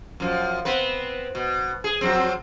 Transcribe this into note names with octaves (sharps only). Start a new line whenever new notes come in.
F#2 F3
B3 C4 B4
B2
G#4
F2 F#3 C4